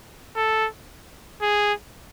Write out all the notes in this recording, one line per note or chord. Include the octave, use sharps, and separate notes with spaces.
A4
G#4